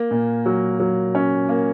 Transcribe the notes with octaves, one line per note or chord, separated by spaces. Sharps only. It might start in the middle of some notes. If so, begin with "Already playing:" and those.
Already playing: A#3
A#2
F#3
F#3
C#4
A#3